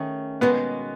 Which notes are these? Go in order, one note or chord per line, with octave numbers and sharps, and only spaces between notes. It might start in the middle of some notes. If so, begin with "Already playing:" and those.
Already playing: D#3 A3 C#4 G#4
B2 G#3 B3